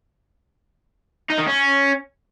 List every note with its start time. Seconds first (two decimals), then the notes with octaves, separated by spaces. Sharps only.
1.30 D#4
1.38 D#3
1.47 C#4